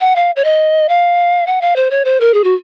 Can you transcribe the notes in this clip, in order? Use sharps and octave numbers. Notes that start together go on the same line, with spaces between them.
F#5
F5
C#5
D#5
F5
F#5
F5
C5
C#5
C5
A#4
G#4
F#4